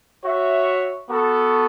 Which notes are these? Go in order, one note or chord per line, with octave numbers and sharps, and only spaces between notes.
F#4 C#5 E5
B3 F#4 A4